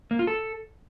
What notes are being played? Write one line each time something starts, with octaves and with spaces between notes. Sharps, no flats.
A#3
F4
A4